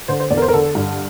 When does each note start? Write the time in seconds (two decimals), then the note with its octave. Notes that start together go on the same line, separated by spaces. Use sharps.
0.08 D3 C5
0.20 C5
0.30 E2 D5
0.37 A#4
0.42 C5
0.48 A#4
0.53 D3 A4
0.75 G2